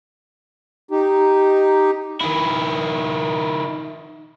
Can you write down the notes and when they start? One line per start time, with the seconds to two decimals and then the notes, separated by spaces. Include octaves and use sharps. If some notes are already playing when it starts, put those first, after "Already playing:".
0.91 D#4 G4
2.21 D#3 E4